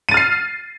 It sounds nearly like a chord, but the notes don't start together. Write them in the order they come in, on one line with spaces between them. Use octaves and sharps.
D#7 A6 F6 C7